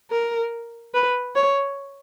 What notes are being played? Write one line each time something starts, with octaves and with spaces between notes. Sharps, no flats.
A#4
B4
C#5